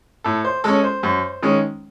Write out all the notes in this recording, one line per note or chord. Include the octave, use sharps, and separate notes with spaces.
A2 A4
C5
G#3 C#4 A4
C5
F#2
D#3 G#3 C#4